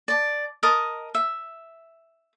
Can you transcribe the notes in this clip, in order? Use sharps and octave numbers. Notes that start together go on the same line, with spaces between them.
D5 A5
A#4 D#5 A5 D#6
E5